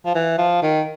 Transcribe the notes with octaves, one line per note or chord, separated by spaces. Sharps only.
F3
E3
F3
D#3